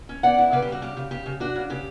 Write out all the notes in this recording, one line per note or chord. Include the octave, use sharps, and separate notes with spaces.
C#4
B3 D5 F#5
E4
C#3 B4 D5
G4
G3 F#4
C#3 G4
C#3
C#3 G4
C#3
D4 F#4
C#3
C#3 G4